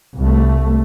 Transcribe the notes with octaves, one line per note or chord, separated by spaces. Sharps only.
C2 A3